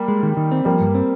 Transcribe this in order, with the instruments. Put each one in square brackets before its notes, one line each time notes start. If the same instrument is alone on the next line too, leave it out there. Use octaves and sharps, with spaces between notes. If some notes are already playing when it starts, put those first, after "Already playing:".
Already playing: [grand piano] G3 A#3
[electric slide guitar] G#3
D#3
D#3
C4
[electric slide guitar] F3 [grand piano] G3 A#3
[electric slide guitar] G2
C4